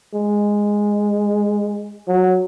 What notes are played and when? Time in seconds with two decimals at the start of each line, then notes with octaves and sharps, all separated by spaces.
0.14 G#3
2.08 F#3